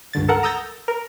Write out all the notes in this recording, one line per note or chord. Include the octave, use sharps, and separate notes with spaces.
C#2 G2 D3 A6
A4 A#4 F#5 A#5
A#5 D#6 E6 G6 A6 A#6
A#4